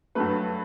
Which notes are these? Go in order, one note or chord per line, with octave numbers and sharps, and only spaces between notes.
G2 F#3 A3 B4